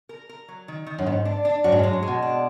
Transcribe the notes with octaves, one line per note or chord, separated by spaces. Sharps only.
A#4
A#4
F#3
D#3
D#3
F#2
G#2 B3
D4
D4
F#2 F#4
G#2
F#2
G#3
G#2
G#3
B2
D4